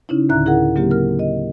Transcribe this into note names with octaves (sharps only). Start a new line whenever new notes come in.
C#3 C#4 D#4 E4
D2 A2 D3 E5 A#5 F#6
E4 G#4 A#4 F#5
C#3 F#3 A#3 C4 G4
A#4 F6
D#5